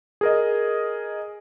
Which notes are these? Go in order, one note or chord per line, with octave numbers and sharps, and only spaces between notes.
G#4 A#4 D#5